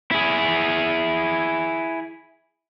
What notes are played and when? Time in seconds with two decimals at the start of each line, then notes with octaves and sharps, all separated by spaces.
0.12 E4 G#4